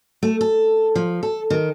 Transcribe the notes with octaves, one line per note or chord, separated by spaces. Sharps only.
A3
A4
F3
A4
D#3